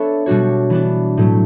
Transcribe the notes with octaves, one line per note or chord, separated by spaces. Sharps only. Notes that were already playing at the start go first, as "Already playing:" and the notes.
Already playing: B3 D4 A4 C#5 E5
B2 G3 D4 F#4 C#5
E3 B3 D4
A2 F#3 A3